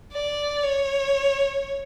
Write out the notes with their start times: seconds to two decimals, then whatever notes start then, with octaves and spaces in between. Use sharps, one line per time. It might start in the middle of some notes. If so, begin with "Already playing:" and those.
0.13 D5
0.63 C#5